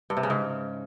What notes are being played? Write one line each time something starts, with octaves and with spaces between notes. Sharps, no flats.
G2
C3
C#3
G#2